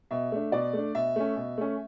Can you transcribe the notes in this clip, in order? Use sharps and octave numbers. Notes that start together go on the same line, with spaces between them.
B2 E5
A3 D4
B2 D5
A3 D4
B2 E5
A3 C#4
B2
A3 C#4